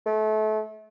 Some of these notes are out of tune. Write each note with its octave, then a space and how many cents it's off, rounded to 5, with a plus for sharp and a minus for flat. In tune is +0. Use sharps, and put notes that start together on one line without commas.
A3 -30